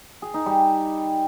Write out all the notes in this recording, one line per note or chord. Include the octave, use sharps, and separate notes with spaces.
G#4
D#4
G3